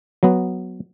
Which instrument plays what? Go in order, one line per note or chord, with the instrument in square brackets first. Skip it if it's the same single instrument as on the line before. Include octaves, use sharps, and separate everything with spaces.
[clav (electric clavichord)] F#3 B3